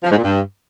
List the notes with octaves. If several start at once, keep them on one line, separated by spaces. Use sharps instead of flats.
F3
G#2
A#2
G2